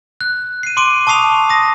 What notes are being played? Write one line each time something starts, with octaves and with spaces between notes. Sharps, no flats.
F#6
C7 D#7
C6 D6 D7 D#7
A5 C#6 D#6 C7 F7
D#6 A#6